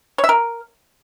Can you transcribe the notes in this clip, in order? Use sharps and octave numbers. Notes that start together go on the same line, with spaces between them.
C#5
E5
A#4